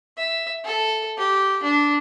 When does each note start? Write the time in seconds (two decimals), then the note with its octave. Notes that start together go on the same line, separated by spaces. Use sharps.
0.18 E5
0.65 A4
1.18 G4
1.63 D4